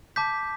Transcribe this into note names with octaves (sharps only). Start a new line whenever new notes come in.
A5 D6 G6 B6